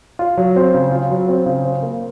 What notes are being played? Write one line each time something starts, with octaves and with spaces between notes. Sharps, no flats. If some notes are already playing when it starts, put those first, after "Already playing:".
F4
F#3
C4
C#3
F4
F#3
C4
C#3
C5
A#3